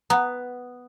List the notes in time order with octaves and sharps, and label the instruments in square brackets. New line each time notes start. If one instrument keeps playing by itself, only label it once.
[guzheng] B3 [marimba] F#5 A#5